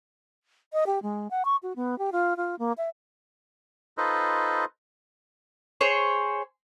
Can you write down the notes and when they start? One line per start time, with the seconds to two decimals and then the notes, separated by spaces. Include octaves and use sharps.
0.73 D#5
0.86 G4
1.03 G#3
1.30 F#5
1.45 C#6
1.63 F#4
1.76 B3
1.98 G4
2.12 F4
2.37 F4
2.59 A#3
2.78 E5
3.98 D#4 F4 A4 B4 C5 D#5
5.81 G#4 C5 C#5